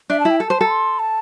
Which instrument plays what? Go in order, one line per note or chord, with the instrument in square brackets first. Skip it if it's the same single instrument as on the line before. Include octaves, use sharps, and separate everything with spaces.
[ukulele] D4 [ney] E5
[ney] A5
[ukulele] E4
[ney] G5
[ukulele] A4 [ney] A5
[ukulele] C5
A4
[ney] C6
A5